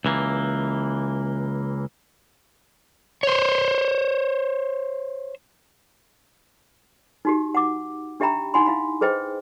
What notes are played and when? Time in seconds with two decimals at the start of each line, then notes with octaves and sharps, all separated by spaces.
0.05 C#2 E3 A#3
3.23 C5 C#5
7.25 D#4 F#4 G4
7.55 F#5 D6
8.20 D4 G4 E5 G5 A#5 B5
8.54 D#4 E4 F#5 G#5 B5 C6
8.66 E4 F5 B5
9.01 G#4 B4 C5 D#5 G5